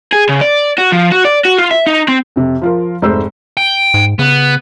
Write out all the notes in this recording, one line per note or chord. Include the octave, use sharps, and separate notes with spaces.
G#4
C#3
D5
F#4
F3
F#4
D5
F#4
F4
E5
D#4
C4
F2 C3
F3 F4 A#4
F1 G#2 A3 C5 E6
G5
G#2
C#3 B3